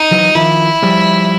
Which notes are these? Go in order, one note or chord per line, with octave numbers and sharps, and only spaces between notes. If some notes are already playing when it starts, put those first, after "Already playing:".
Already playing: D#4
E3 F#3
D#3 F3 E4
F3 G3